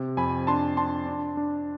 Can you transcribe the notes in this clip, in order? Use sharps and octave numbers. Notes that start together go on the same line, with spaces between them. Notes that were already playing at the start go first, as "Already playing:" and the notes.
Already playing: C3
F2 G#5 B5
D4 A5 C6
D4 A5 C6
D4
D4